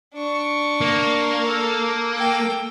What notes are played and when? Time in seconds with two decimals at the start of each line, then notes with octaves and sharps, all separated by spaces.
0.14 D4 C#6
0.81 A#3
1.46 A4
2.14 A4 G5